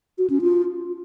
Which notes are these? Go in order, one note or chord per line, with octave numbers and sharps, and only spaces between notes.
F#4
C#4
F4